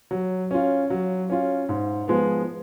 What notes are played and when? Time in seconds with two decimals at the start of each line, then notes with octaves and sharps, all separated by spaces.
0.11 F#3
0.51 C#4 F4
0.90 F#3
1.30 C#4 F4
1.69 G#2
2.08 F3 G#3 B3